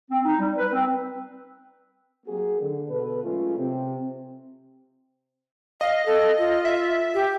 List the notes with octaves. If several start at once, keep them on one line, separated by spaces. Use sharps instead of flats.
C4
D#4
G3
B4
C4
F#3 G3 A#3 C4 F#4 G#4
D3
B2 A4 B4
F#3 G#3 A3 C#4 F4
C3 C4
D#5 F5
A4
F4
E5
G4